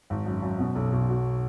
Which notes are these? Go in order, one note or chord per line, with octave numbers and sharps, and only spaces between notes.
G#1
F#2
F#2
B2
B1
B1
F#4